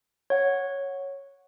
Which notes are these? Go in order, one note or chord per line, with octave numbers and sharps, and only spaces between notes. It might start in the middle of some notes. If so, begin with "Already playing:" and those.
C#5 F#5